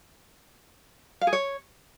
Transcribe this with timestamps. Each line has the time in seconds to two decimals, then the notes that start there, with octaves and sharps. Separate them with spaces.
1.21 F5
1.27 G#4
1.33 C#5